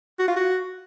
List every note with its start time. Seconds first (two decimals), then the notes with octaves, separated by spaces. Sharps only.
0.19 F#4
0.28 F4
0.36 F#4